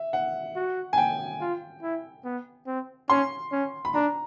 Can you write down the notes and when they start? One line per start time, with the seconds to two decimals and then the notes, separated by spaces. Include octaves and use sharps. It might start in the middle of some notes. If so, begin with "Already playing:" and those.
Already playing: E5
0.13 F#5
0.56 F#4
0.93 G#5
0.98 G5
1.40 F4
1.82 E4
2.24 B3
2.67 C4
3.09 C#4 C6
3.52 C#4
3.85 B5
3.94 D4 A#5